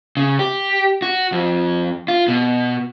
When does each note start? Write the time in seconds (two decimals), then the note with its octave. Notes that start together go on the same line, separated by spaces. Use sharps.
0.17 C#3
0.39 G4
1.02 F#4
1.32 F2
2.08 F4
2.28 B2